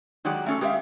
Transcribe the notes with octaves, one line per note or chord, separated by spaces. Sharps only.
D#3 F#3 G#3 G4 D5 F#5
A3 C#4 A4
G#3 G4 A#4 C#5 E5 F5